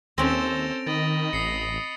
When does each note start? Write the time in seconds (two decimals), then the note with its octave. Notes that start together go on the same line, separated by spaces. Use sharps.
0.18 D#2 C4 C#4 A4 C5 A#6 D7 F7
0.87 D#3 D#5 B5 A6
1.33 A1 D#6 C7 C#7